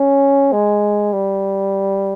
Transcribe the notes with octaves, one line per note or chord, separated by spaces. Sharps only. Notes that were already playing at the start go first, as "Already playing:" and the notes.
Already playing: C#4
G#3
G3